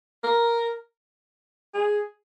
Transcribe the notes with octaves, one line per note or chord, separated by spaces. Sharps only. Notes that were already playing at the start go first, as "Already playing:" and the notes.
A#4
G#4